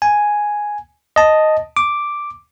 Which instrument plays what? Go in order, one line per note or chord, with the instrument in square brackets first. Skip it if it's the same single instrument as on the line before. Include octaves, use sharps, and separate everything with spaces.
[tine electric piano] G#5
D#5 A5
D6